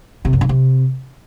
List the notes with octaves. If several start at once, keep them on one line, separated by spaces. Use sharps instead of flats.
C3
F#2
C#3
C3